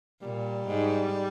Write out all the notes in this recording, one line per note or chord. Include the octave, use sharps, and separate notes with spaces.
A#2 G3
G#2